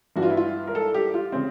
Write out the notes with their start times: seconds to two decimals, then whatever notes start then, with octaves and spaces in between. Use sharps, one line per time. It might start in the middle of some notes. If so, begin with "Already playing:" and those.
0.16 G2 E3 F#4
0.23 F4
0.30 E4
0.37 F4
0.67 A#4
0.75 A4
0.94 G4
1.14 F4
1.32 C#3 C4